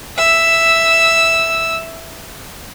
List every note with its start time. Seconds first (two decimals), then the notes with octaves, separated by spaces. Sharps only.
0.17 E5 E6